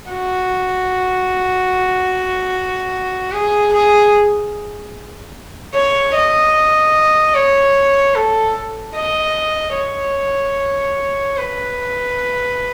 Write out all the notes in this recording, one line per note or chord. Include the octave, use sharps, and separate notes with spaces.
F#4
G#4
G#4
C#5
D#5
C#5
A4
D#5
C#5
B4